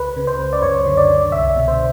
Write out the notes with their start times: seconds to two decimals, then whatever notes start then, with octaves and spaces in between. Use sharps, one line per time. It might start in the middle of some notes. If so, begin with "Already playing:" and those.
Already playing: C#2 B4
0.16 C#3
0.27 C5
0.39 C#2
0.53 D5
0.62 F#2 C#5
0.86 D3
0.97 D5
1.10 D3
1.32 C2 E5
1.56 B2
1.68 C5